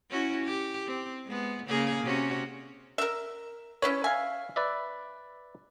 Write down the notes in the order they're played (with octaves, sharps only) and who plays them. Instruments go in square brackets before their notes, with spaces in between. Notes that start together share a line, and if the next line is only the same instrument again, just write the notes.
[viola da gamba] C#4 E4 F#4
G4
C4
G#3 B3
C#3 A#3 G#4
C3 C#4 F#4
[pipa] A#4 E5
[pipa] C#4 E4 B4 [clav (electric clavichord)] C#5
[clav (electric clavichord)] E5 F5 [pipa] G#5
[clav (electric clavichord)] B4 D5 E5